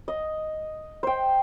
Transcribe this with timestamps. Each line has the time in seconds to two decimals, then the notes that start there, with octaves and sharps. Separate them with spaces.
0.08 D#5
1.03 C5 G5